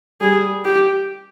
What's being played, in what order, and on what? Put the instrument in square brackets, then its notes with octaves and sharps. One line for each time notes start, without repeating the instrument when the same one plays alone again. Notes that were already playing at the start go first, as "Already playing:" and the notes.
[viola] G3 [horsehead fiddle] G#4
[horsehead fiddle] G4